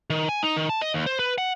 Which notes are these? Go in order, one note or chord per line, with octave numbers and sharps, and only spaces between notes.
D#3
G#5
D#4
D#3
A5
D#5
D#2
C5
B4
F#5